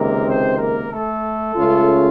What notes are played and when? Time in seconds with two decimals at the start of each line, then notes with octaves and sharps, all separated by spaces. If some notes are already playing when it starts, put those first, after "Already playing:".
Already playing: C#2 C3 D#3 A#3 A#4
0.24 C4 C5
0.57 A#3 A#4
0.90 A3 A4
1.55 C#2 C#3 A3 C#4 F4